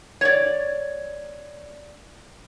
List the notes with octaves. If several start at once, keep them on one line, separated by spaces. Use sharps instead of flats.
C#5 D5